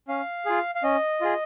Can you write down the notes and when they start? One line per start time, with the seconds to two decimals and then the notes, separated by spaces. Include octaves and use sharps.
0.08 C#4 F5
0.46 F4 G#4
0.75 F5
0.83 C#4 D#5
1.21 F4 G#4